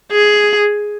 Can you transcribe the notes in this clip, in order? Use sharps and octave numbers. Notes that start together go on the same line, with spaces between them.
G#4